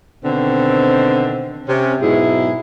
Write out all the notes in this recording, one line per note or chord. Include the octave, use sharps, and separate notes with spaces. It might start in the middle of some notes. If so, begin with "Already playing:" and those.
B2 D3 D#3 C4
C3 C#4
G#2 B2 F#3 G#3 E4 G#4